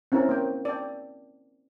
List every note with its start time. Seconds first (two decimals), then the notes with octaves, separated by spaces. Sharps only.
0.12 C4 C#4 E4 A#4
0.29 A#3 G5
0.65 D5 G5